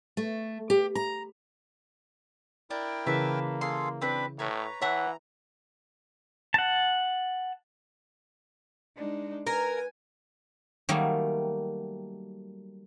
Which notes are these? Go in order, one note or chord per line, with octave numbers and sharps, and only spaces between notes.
A3
G4
A#5
D4 E4 A#4 G5
C#3 E3 A#3 B4 E5 A5
G#4 A4 F5 C6
C4 D4 B4 B5
A2 B4 C#5 A#5
E3 C#5 E5 F#5 A5 F#6
F#5 A5
G#3 D4 D#4
A#4 B4 G#5
D#3 F#3 G3 A3 A#3